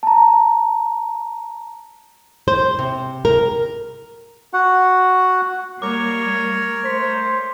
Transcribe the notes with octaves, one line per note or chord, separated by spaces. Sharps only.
A5 A#5
C5
C3
A#4
F#4 F#5
G3 A#3 A#4 C#5 D6 G#6
A3 C5 B6